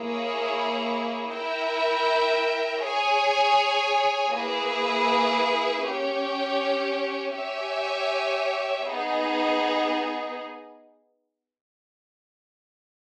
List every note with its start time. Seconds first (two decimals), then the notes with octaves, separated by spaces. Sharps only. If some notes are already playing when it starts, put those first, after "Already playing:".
Already playing: A#3 E4 G#4 C#5
1.29 E4 A#4 E5 G5
2.81 G#4 C#5 G#5
4.32 A#3 E4 G#4 B4
5.84 C#4 G4 C#5
7.35 G4 C#5 E5 G#5
8.86 B3 D#4 G#4